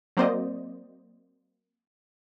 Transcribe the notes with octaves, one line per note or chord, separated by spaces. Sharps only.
F#3 A#3 C4 C5 D5 D#5